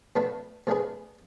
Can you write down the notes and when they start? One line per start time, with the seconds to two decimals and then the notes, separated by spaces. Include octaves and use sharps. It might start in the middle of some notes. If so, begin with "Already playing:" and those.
0.16 B2 A3 D4 F#4 B4
0.67 B2 A3 D4 G#4 B4